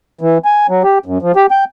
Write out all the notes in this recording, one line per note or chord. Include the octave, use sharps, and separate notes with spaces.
E3
G#5
F#3
G4
F#2
F3
G4
G5